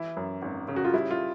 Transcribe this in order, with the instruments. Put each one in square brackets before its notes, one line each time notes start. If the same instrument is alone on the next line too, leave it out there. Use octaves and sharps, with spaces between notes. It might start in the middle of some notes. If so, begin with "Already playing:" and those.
Already playing: [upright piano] E3 E4
F#2
G#1
C#3
F#4
F4
G3 E4
F4